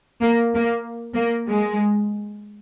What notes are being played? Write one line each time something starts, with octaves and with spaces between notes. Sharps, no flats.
A#3
A#3
A#3
G#3